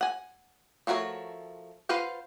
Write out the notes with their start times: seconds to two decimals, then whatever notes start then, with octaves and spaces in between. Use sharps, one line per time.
0.01 F#5 G#5
0.87 F3 A3 F#4 A#4 C#5
1.89 F4 B4 C5 F5 F#5